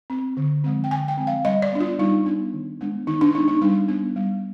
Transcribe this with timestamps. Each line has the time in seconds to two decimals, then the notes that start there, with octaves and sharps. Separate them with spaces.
0.10 C4
0.37 D3
0.64 F3 G#3 C4
0.84 G5
0.91 D3 G#5
1.08 G5
1.17 F3 G#3 C4
1.27 F5
1.44 G3 D#5
1.62 D5
1.72 B3 D4
1.80 F4
1.99 G3 D#4
2.26 B3 D4
2.53 D#3
2.81 G#3 B3 D4
3.07 D#3 D#4
3.21 D4
3.34 G#3 B3 D4 D#4
3.48 D#4
3.61 G3 D4
3.88 B3 D4
4.16 G3